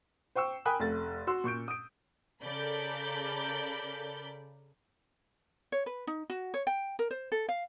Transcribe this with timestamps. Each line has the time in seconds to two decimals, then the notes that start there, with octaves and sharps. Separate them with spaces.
0.35 C5 G5 C#6 E6
0.65 A#4 G5 G#5 B5 D#6 F#6
0.80 F1 A3 A6
1.27 F#4 C6 E6
1.44 A#2 C#6 G6 D7
1.68 D#6 D7
2.43 C#3 A4 A#4 D5 B5 G6
5.72 C#5
5.86 B4
6.07 D#4
6.30 F#4
6.54 C#5
6.67 G5
6.99 A#4
7.11 C5
7.32 A4
7.49 F5